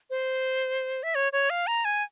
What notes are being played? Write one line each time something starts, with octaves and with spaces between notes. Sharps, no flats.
C5
E5
C#5
C#5
F5
A#5
G#5